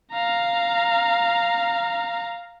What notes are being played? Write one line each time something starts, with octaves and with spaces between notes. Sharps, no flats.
F5 A#5